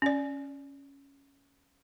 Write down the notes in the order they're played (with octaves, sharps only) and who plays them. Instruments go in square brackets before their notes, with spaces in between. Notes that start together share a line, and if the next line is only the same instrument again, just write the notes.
[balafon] C#4 D5